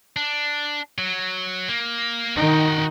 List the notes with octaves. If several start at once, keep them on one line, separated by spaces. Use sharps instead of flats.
D4
F#3
A#3
D#3 D#4 F#4 G5